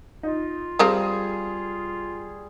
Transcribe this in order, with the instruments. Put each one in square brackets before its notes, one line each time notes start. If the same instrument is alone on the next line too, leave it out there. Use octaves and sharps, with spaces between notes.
[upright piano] D#4 [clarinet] F4
[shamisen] F3 C4 A#4 [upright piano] G3 [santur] G#4